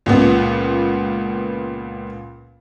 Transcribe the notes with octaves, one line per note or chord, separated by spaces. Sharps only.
C#2 A#2 B3